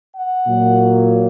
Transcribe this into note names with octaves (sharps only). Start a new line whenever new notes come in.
F#5
A#2 F#3 A#3